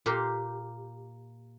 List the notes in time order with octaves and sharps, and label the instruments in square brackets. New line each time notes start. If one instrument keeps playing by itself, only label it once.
[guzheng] A#2 A#3 G4 A#4 C6